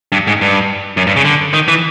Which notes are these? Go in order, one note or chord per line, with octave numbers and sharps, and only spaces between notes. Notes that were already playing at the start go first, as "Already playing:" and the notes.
G2
G#2
G2
F#2
G2
C#3
D3
D#3
E3